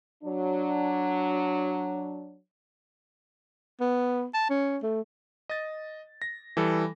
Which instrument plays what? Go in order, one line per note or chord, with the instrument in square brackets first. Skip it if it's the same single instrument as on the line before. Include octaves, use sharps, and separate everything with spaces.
[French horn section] F#3 D4
[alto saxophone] B3
A5
C#4
A3
[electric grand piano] D#5 A6
A#6
E3 G3 A4